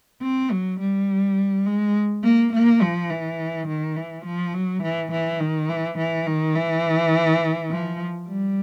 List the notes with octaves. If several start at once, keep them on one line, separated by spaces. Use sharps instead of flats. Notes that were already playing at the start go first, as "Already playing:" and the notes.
C4
F#3
G3
G#3
A#3
A#3
F3
E3
D#3
E3
F3
F#3
E3
E3
D#3
E3
E3
D#3
E3
F3
G3